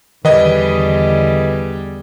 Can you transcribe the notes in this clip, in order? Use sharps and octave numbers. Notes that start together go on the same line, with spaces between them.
E2 D3 D#3 G3 G#4 B4 D#5